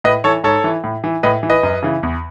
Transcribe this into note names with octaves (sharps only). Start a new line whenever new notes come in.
A2 B4 D#5
E3 A4 C#5
G#2 A4 C#5
E3
A2
E3
A2 B4 D#5
E3
B4 D#5
F#2
C#3 E3
E2